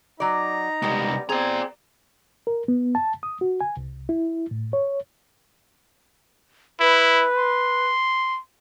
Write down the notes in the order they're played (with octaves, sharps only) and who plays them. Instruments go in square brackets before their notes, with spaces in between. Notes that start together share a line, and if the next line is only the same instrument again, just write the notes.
[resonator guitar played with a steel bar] F#3 D5 [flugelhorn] D#4 [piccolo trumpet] A#5
[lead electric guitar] C2 G#3 [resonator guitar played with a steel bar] G3 B3
[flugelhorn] C4 [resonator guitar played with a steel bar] G#4 [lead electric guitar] D5 A#5 [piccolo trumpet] G#5
[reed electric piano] A#4
B3
A5
D#6
F#4
G#5
C2
E4
A2
C#5
[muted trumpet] E4 [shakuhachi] B4
[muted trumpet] C6